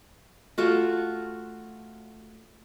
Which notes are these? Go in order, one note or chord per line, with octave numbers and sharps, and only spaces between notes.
A3 F4 F#4